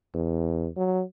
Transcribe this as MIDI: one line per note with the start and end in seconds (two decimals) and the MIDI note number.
0.15 0.68 40
0.77 1.03 54